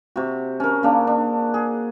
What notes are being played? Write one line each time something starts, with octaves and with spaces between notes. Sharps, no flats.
C3 F#4
C#4 A#4
C#3 A#3 D4
D4
G#4